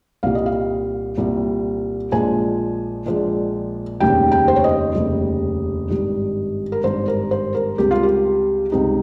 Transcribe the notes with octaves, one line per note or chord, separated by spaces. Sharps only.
C2 A#2 G3 F5
D#5
F5
C2 A#2 G3
A#1 A#2 F3 G#3 G#5
A#1 A#2 F3 G#3
F1 D#2 C#3 G3 G5
G5
C5
C#5
D#5
F1 D#2 C#3 G3
G#1 G2 G3
A#4
G#1 G2 G3 C5
A#4
C5
A#4
C#2 C3 G3 G4
F4
G4
C#2 C3 G3 D#4